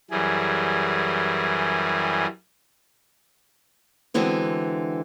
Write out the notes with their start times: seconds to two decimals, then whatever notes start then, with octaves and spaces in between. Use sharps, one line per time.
0.11 F#2 E3 G3 G#4
4.14 D3 E3 G#3 B3 C4 F#4